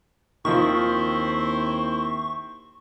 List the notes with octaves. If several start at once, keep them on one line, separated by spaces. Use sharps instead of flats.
D#2 D#3 F3 C4 E4 C5 C#6